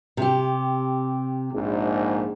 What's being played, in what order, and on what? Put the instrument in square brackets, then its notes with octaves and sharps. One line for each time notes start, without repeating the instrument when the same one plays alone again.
[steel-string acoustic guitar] C3 G4
[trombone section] A#1 G#2